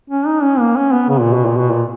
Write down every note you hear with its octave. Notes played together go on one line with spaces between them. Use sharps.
C#4
D#4
C#4
A#3
C#4
B3
C#3
A#2
B2
A#2
B2
A#2